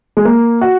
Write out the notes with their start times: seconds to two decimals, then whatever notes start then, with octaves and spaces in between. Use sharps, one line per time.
0.17 G#3
0.25 A#3
0.61 F#4